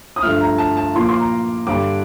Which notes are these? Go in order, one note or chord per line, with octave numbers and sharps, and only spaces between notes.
D#6
G2 D3 F3 A3 F6
A#5
A5
A5
A#2 F3 A#3 C6
D6
C6
A#5
G2 D3 G3 D6